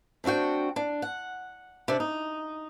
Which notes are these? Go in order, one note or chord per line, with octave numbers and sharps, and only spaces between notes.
A3 C4 D4 F#4 G5
D4
F#5
C3 D4
D#4